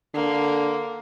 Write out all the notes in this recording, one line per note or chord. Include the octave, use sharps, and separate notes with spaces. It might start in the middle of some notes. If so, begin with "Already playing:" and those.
D3 A#3